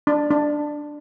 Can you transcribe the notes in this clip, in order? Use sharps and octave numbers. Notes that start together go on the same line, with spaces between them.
D4
D4